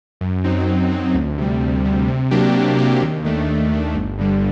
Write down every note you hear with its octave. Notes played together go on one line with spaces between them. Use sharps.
F#2
F#3 C4 D#4
F#2
F#3 C4 D#4
D2
C3 G3
D2
C3 G3
C3
F#3 A#3 D4 G4
C3
F#3 A#3 D4 G4
D#2
D#3 A3 D4
D#2
D#3 A3 D4
G1
G2 D3 G3